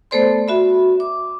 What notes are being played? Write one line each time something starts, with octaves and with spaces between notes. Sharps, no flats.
A3 B3 A4 C5 D5 C6
F#4 E5 B5
D6